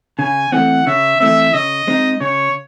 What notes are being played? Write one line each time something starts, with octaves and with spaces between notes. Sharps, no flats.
C#3 G#5
E3 A3 C4 F#5
C#3 E5
E3 A3 C4 E5
C#3 D#5
G#3 C4 D#4
C#3 C#5